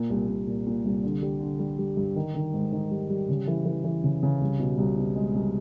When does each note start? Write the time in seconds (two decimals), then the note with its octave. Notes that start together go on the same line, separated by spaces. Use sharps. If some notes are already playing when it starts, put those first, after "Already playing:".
Already playing: A#2
0.10 C2
0.28 A#2
0.47 A#2
0.67 A#2
0.85 C2
1.04 D3
1.22 G3
1.40 D3
1.59 G3
1.78 G3
1.97 G2
2.16 D#3
2.35 D#3
2.54 G#2
2.73 D#3
2.91 G3
3.10 G3
3.29 C#3
3.47 E3
3.65 E3
3.84 E3
4.04 C#3
4.23 C#3
4.41 C2
4.60 B2
4.78 C2
4.97 B2
5.16 G#3
5.34 C2